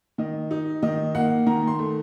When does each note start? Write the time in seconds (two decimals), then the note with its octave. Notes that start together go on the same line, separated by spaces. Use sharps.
0.18 D#3 D#5
0.51 D#4
0.83 D#3 D#5
1.15 A#3 F#5
1.47 D#3 A#5
1.67 C6
1.79 A3